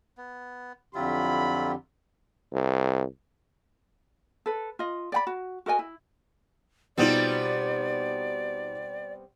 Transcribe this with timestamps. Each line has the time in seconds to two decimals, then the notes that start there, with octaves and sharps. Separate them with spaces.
0.17 B3
0.95 F2 D3 F#3 E4 F4 G4 B5
2.53 C2
4.46 A4 B4
4.79 F4 D#5
5.12 D5 G5 B5
5.27 F#4
5.66 F#4 A#4 D#5 G#5
5.79 E4
6.98 B2 G3 B3 C4 D#4 F4 D5